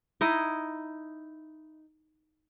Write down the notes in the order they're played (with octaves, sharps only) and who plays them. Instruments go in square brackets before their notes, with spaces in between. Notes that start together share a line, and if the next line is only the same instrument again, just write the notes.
[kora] D#4 E4 D#5